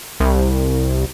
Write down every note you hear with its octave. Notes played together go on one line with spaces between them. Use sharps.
C2